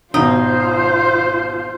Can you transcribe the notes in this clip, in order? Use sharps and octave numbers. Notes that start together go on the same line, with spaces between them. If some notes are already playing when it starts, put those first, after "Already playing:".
G#1 B2 D#4 F4 C5 D#6